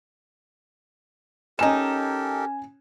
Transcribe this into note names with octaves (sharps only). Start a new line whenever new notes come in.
G#3 C#4 D#4 G4 A4 A#4 G#5 E7